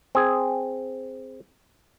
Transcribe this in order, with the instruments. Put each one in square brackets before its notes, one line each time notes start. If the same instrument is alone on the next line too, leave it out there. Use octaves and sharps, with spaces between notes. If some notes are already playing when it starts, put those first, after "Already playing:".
[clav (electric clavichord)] C4 G#4